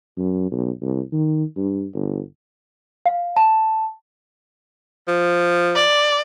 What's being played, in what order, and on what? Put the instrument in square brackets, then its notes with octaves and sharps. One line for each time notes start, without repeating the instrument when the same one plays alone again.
[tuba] F#2
B1
C2
D#3
G2
G1
[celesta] F5
A5
[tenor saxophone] F3
[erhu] D5